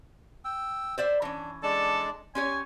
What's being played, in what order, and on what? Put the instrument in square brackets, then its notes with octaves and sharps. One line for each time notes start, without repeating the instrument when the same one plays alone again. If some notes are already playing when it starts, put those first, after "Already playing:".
[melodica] G5 E6
[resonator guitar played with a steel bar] C5 D5 E5
[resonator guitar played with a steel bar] E3 C#4 [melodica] D4
[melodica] G#3 D4 D5 [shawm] A4
[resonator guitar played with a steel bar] C#4 G4 C#5 [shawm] G#5 [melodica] C6